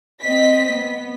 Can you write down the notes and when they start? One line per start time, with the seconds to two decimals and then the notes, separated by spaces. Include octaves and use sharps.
0.22 C4 D#5 B6
0.75 B3